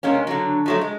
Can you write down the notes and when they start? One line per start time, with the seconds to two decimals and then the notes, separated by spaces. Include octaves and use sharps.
0.03 C3 G#3 A#3 C#4
0.27 D3 F#3
0.66 F3 F#3 A3
0.81 G#3